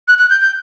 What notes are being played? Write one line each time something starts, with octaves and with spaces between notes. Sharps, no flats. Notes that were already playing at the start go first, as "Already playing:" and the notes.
F#6
F#6
G6
G6